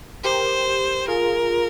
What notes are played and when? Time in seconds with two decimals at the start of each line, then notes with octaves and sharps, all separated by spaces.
0.24 G4 A#4 C5
1.08 F4 G#4 A#4